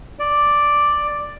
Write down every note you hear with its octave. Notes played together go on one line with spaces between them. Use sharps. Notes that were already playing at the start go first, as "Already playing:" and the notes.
D5